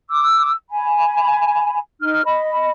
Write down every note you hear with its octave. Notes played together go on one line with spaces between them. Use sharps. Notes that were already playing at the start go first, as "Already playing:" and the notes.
D6 E6
G#5 B5
D#4 F6
D#5 B5